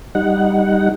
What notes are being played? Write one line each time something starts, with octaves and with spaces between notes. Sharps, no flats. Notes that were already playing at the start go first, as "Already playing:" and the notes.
G3 D#4 F#5